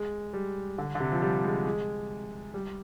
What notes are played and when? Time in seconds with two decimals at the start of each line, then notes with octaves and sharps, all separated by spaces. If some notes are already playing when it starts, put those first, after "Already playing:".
Already playing: G#3
0.33 G3
0.78 D3
0.95 D3
1.00 C3
1.12 F3
1.22 G3
1.44 G#3
1.66 G#3
2.54 G3